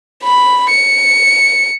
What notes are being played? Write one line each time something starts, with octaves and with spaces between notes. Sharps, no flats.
B5
C#7